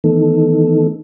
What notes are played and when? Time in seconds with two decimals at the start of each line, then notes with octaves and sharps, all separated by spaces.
0.04 D#3 E3 A3 B3 D#4 A4